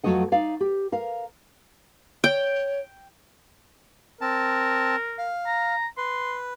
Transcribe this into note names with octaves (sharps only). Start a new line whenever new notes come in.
F2 C#3 F#3 A3 D#5 F#5
D#4 D5 F5
G4
A#4 F5
C#5 G5
C4 A#4 A5
F5
A#5
B4 C6